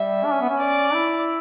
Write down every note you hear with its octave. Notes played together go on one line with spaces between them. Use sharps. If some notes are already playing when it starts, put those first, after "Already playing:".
Already playing: G3 E5
D4
C#4
B3
C#4
D5
E4